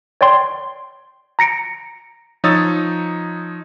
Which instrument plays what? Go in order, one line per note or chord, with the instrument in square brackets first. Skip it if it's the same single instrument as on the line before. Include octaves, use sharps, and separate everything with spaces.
[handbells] C#5 D5 G5 C6
A#5 A#6 C#7 D7
[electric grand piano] F3 D#4 C#5 D#6 E6 A6